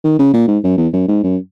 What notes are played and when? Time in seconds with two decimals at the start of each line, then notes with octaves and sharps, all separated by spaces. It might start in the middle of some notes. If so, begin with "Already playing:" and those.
0.04 D#3
0.19 C#3
0.33 A#2
0.48 G#2
0.64 F#2
0.78 E2
0.93 F#2
1.08 G#2
1.23 F#2